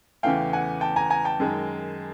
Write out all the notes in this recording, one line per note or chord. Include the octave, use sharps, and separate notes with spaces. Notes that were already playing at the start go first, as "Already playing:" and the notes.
E2 C#3 E3 A3 F5 G5
F#5 G#5
G5 A5
G#5 A#5
G#5 A#5
G5 A5
F#2 D#3 G#3